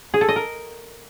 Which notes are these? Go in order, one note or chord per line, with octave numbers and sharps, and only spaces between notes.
G#4
A4
D#5
A#4